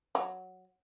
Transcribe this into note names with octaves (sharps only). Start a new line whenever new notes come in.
F#3